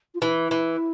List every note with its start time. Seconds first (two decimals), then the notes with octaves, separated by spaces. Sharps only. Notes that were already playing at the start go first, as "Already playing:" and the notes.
0.15 F4
0.22 E3 E4
0.51 E3